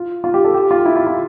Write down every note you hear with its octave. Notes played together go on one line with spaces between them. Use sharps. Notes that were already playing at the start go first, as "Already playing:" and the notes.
Already playing: F4
F4
G4
A4
G4
F4
E4
F4
F4